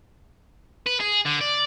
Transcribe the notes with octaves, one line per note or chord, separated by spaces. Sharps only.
B4
G#4
D3
D5